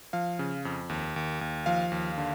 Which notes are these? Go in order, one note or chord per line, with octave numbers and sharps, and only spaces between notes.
F3 F5
C#3
F2
D#2
D#2
D#2
F3 F5
D#2
D3